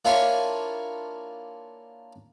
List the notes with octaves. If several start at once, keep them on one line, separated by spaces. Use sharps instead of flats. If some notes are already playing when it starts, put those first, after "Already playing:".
A#3 D4 E4 F4 C#5 G#5